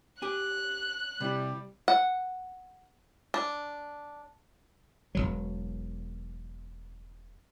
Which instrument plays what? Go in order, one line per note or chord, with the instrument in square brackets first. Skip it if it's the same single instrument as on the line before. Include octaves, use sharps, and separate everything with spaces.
[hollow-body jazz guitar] G4 G#5 [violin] F#6
[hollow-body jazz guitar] C3 E4 [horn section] G3
[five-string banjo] F#5
D4
[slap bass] E1 C2 F#3